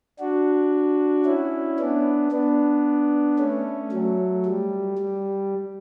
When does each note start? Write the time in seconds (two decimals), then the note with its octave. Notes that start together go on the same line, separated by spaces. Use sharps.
0.20 D4 F#4
1.25 C#4 E4
1.80 B3 D4
2.32 B3 D4
3.39 A3 C#4
3.92 F#3 A3
4.46 G3
4.98 G3